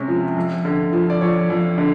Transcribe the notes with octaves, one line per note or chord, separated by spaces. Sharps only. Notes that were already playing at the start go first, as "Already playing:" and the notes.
Already playing: C3 G#3 C#4
F3
F2
D3
F3
D5
F2 C#5
F2
D3